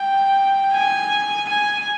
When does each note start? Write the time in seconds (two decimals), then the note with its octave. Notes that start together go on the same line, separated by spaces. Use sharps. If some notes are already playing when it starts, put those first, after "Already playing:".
Already playing: G5
0.73 G#5
1.49 G#5